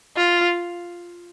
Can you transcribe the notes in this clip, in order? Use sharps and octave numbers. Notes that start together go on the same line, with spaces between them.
F4